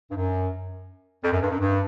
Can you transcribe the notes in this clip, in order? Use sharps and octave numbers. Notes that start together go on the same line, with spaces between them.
G2
F#2
F2
F#2
G2
F#2
G2